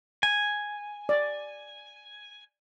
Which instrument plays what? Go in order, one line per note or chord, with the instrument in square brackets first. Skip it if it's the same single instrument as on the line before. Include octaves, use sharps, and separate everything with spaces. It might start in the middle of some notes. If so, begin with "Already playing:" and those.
[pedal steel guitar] G#5
[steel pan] D5